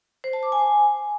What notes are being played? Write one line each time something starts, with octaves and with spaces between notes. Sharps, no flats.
C5
A5
D6
G#5